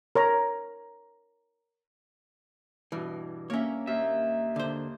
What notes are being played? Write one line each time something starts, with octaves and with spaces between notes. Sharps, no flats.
A#4 C#5 A#5
G2 B2 E3
A#3 C#4 C#5 E5
D#2 E5
D3 C5